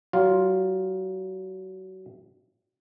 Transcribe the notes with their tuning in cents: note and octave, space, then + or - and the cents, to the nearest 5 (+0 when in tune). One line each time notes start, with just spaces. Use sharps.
F#3 +30 F4 +0